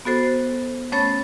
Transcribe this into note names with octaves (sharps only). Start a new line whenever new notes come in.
B3 F#4 A4 C5
A3 C#4 C#5 B5 A6